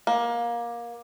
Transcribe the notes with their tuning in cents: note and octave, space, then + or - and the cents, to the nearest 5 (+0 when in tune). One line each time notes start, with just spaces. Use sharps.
A#3 +20